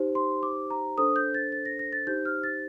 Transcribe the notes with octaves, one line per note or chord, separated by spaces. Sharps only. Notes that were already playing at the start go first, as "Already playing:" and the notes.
Already playing: D#4 G4 C5
C6
D6
A#5
D4 A4 C5 D#6
G6
A6
A6
A#6
A#6
A6
D#4 G4 C5 G6
F6
A6